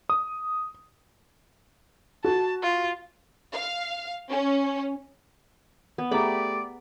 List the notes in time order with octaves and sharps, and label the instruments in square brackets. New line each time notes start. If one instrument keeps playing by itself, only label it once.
[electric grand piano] D#6
[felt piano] F#4 [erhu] A5
[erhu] F4
[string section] F5
C#4
[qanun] B3
[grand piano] A3 G4 [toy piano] G#4 A#5 [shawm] D5 [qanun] B5 D6